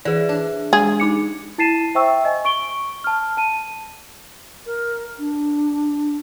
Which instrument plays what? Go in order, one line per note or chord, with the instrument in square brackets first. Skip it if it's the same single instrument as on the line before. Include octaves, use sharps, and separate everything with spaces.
[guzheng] E3 [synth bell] G#4 D5
[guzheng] D4
[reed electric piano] G#3 [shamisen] G#4
[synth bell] D#4 D6 C#7
[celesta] E4 A5 A6 C7 D#7 E7
C5 E5 G5 C#6 E6
D#5 G#5
C#6 D7 G7
A5 F6
A5 D#7
[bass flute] A#4
D4